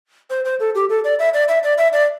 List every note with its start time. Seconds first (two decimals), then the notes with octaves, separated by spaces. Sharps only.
0.30 C5
0.45 C5
0.60 A4
0.75 G4
0.90 A4
1.04 D5
1.19 E5
1.34 D5
1.48 E5
1.63 D5
1.78 E5
1.93 D5